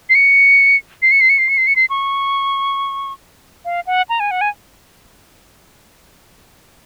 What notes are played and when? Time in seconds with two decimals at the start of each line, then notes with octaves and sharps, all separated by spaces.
0.10 C7
0.15 C#7
1.02 C7
1.12 C#7
1.21 C7
1.30 C#7
1.39 C7
1.49 C#7
1.58 C7
1.67 C#7
1.76 C7
1.90 C#6
3.65 F5
3.87 F#5
4.09 A#5
4.20 G#5
4.31 F#5
4.41 G#5